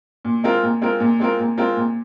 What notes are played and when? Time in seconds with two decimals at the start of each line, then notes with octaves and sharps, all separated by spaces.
0.25 A#2
0.44 G#3 C4 F4 A#4
0.63 A#2
0.82 G#3 C4 F4 A#4
1.00 A#2
1.20 G#3 C4 F4 A#4
1.39 A#2
1.57 G#3 C4 F4 A#4
1.76 A#2